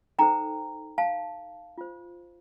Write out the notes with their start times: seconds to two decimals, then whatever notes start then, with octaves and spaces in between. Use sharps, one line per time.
0.19 D#4 A4 C5 G5 A#5
0.98 F5 A5
1.78 F4 C5